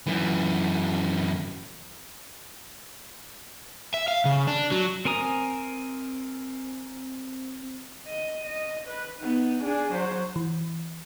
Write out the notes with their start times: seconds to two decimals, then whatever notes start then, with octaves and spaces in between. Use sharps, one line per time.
0.07 F#2 E3
3.94 E5
4.08 F5
4.25 C#3
4.47 D4
4.72 F#3
5.05 C4 A#4 G#5 A#5 D#6
8.08 D#5
8.46 D#5
8.88 B4
9.20 B3 D#4
9.64 D4 G#4
9.93 F#3 C5
10.36 E3